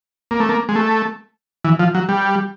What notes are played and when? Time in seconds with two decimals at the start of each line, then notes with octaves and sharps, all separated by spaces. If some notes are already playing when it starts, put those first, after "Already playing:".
0.31 A#3
0.40 A3
0.49 A#3
0.69 G#3
0.75 A3
1.65 E3
1.79 F3
1.95 F#3
2.09 G3